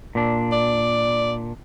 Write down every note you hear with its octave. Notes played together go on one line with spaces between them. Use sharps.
A#2 D4
D5